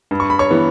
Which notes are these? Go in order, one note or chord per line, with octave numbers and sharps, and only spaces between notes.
G2
C#6
B5
C#5 C#6
E3 B3